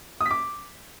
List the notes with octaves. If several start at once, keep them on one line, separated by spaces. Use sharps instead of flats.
D#6
B6
D6